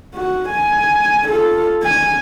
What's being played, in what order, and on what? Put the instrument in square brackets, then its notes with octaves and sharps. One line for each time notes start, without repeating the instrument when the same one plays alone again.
[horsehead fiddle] F#4
G#5
F4 A4
G#5